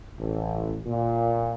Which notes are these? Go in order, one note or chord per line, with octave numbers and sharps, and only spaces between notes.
A1
A#2